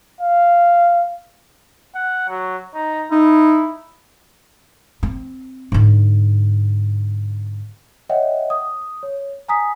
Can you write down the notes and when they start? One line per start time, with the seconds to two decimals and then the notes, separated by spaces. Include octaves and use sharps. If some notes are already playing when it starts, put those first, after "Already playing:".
0.21 F5
1.95 F#5
2.29 F#3
2.74 D#4
3.12 D#4 E4
5.03 C4
5.72 G#2 D3
8.09 C#5 D#5 E5 F#5 G5
8.50 D#6
9.03 C#5
9.48 G#5 A#5 D#6 B6